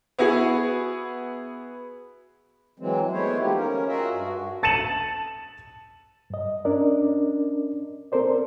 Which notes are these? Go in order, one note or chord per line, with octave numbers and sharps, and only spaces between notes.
B3 E4 F#4 G#4
E3 F#3 G#3 C4
G#3 A3 B3 E4 C5 C#5
D#3 F3 G#3 A#3 D#4 G4
C#4 A#4
F4 F#4 G#4 A#4 D#5 E5
G2 F#4
A5 A6 C#7 D#7 E7 F#7
G2 D#5
C#4 D4 A#4 D5 D#5
C4 A4 A#4 C5 D5